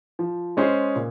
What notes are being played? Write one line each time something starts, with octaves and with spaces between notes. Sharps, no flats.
F3
G#3 C#4 G#4 C5
A#2